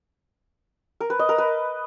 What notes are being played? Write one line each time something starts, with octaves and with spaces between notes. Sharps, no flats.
A#4
B4
D#5
A#4
B4